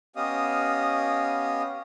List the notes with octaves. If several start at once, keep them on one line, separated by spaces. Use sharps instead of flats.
B3 C#4 G4 D#5 F5 D#6